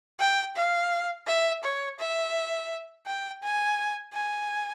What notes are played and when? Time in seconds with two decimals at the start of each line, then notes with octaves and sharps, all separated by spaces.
0.19 G5
0.56 F5
1.27 E5
1.63 C#5
1.99 E5
3.06 G5
3.42 G#5
4.13 G#5